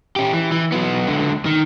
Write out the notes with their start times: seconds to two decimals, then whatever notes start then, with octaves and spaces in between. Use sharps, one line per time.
0.16 C#4 G4
0.33 E3
0.52 E3
0.72 F#3 B3
1.07 C#2 D3
1.45 D#3